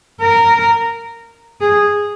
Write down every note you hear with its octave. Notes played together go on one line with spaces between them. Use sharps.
A#4
G#4